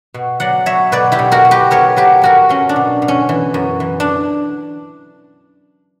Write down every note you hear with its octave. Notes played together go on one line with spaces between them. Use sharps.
B2
F#3 D5 F#5
F#3 C#5 E5
B2 B4 D5
E4 G4
B2
F#4 A#4
B2
G4 B4
B3 A#4 C#5
F#3 G4 B4
B3 F#4 A#4
F#3 C#4
D4
B2
B2
C#4
E3
F#2
E3
D4